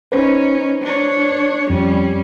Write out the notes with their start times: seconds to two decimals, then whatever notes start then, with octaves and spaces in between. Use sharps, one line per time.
0.12 C#4 D#4 B4 C5
0.82 D4 C#5
1.70 F2 G3 C#4